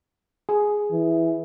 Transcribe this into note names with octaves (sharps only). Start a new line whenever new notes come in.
G#4
E3